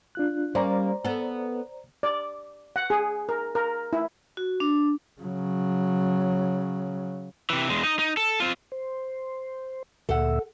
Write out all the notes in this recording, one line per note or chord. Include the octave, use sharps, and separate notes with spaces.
D4 F4 F#6
G3 A#3 C#4 C5 D5 A#5
B3 A4
D5
F#5
G#4
A#4
A#4
E4
F#4
D4
C#3 F#3
C3 E3
E2 G#3
D#4 D#5
D#4
A4
C4 F4
C5
D2 A#2 A4 E5 F#5